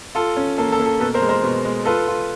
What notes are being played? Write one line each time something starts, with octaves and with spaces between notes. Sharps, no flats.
F4 A4
C#4
A#3 A4
A4
A#3
A4
B2 A4 B4
A#4 C5
G#3
A#4 C5
B2
G#3
F4 A4 B4
F4